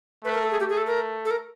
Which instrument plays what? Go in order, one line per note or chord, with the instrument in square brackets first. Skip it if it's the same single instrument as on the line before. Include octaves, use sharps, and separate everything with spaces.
[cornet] A3 [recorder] B4
[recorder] A#4
A4
G#4
[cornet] A3 [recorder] G4
[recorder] G#4
A4
A#4
A4
A#4